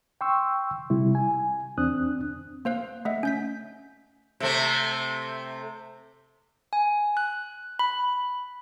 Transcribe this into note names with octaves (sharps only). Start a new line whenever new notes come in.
G5 C6 C#6 E6
C3 G3 E4
G#5
E2 C4 D4 D#6 F#6
A#3 C5 F5 F#6
A3 D#5 E5 F#5
C#4 G6 B6
C3 A3 C4
G#5
F#6
B5